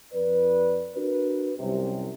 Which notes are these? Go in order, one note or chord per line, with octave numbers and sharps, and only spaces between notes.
F2 B4 D5
D4 F#4 A#4 B4
C2 F#2 C3